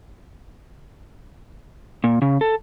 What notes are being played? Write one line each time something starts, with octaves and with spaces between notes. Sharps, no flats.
A#2
C#3
A4